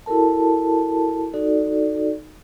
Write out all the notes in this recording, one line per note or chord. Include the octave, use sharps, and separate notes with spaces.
E4 F#4 A4 A#4 A5
D#4 F#4 A4 D5